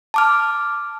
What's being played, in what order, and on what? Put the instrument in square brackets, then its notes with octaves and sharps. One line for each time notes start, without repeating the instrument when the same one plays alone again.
[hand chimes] A5 D6 F6